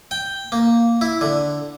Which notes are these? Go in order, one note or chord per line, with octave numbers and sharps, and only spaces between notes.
G5
A#3
E4
D3